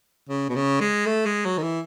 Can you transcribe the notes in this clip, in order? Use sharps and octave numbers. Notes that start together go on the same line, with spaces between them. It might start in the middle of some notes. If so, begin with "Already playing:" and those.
C#3
B2
C#3
G#3
A3
G#3
F#3
D#3
E3